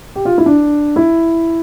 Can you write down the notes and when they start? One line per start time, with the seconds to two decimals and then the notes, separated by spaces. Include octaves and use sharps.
0.16 G4
0.25 F4
0.38 E4
0.46 D4
0.96 E4